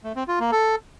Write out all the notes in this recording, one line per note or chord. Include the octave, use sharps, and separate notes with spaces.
A3
C4
F4
A#3
A4